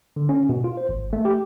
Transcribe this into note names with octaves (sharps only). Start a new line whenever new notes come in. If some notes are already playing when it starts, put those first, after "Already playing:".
D3
C#4
B2
F4
C5
G#1
A3
G4